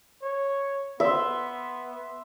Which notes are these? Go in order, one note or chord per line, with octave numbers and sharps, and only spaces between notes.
C#5
B3 E5 C6